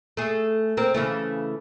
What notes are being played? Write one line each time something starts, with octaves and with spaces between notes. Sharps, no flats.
A3 G#4
C4 A#4
C#3 E3 A3